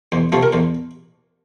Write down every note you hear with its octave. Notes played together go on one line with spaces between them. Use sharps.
E2 C5
C3 F3 A3 C5
A#4
E2 C5